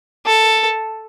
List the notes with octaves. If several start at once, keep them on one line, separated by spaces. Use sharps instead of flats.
A4